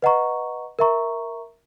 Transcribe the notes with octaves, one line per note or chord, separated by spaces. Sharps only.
B4 D#5 F#5 A#5 C#6
A#4 E5 A#5 C#6